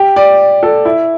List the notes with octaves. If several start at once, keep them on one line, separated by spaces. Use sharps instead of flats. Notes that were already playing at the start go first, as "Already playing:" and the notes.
Already playing: G4
D5
A4
E4